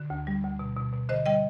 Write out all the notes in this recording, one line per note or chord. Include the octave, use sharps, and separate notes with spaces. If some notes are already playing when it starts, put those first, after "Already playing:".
Already playing: D3
D2
G3
D2
B2
B2
B2
D3 C5 D#5
G3 D#5 G5